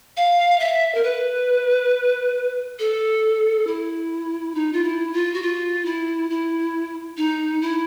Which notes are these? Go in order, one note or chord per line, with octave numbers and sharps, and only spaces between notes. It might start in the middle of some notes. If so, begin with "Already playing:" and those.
F5
E5
A#4
B4
A4
E4
D#4
F4
E4
F4
F#4
F4
E4
E4
D#4
E4